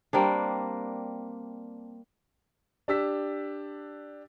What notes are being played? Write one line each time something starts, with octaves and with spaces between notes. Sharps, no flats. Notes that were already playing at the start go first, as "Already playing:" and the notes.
G3 A#3 C4 D4
D4 G4 E6 B6